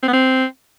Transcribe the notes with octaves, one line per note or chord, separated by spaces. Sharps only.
C4
B3
C4